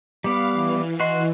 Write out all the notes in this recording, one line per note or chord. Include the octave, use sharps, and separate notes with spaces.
G3 B3 F5 D6
E3
F#4 D#5 C6